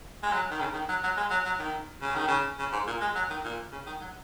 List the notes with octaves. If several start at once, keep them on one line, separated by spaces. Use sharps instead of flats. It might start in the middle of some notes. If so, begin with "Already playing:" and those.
G#3
F#3
D#3
C#3
D#3
F#3
F#3
G#3
F#3
F#3
D#3
C#3
D#3
C#3
C#3
G#2
A#2
G#3
F#3
D#3
A#2
C#3
D#3
F#3